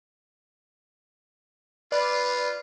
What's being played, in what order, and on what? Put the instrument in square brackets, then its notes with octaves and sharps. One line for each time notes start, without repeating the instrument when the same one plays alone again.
[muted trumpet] F4 [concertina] B4 [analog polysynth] D5